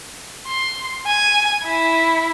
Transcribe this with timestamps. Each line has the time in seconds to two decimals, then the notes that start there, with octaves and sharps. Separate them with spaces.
0.47 C6
1.07 G#5
1.65 E4